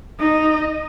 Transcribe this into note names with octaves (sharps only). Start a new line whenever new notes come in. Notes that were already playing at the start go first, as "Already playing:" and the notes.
D#4 D#5